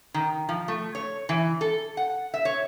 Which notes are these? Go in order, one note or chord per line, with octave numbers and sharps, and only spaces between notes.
D#3
F3
A3
C#5
E3
A4
F#5
E5
C#5